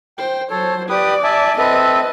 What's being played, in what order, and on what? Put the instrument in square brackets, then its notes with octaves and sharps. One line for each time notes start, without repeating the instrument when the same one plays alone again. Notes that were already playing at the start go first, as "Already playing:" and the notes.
[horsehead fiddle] C5 [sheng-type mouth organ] G5
[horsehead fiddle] F#3 C5 [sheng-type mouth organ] A4 C#5
[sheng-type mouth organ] G4 B4 D#6 [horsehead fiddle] D5
[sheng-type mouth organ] E5 G#5 A5
[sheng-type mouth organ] C4 A4 E5 [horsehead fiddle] B4 D#5